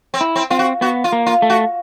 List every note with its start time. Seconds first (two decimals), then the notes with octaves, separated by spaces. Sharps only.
0.14 C4
0.21 E4
0.36 C4
0.50 C4 F4
0.59 F#4
0.81 B3 F#4
1.04 F4
1.12 A#3
1.26 F4
1.42 A3
1.50 F#4